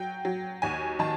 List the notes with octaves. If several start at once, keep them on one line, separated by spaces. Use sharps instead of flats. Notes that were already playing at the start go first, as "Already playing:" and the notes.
Already playing: F#3 G5
F#3
D#2 G#5
D#3 A5